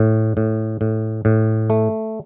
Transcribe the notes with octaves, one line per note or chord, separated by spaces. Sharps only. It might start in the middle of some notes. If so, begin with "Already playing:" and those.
Already playing: A2
A2
A2
A2
A3